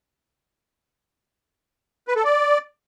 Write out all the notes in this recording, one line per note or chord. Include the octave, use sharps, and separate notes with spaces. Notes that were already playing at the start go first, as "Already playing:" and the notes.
B4
A4
D5